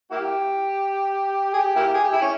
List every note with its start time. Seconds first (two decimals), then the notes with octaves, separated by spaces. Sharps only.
0.11 A#3 E4 G4
1.53 G#4
1.58 G4
1.76 A#3 E4 G4
1.94 G#4
2.04 G4
2.13 E4
2.22 C#4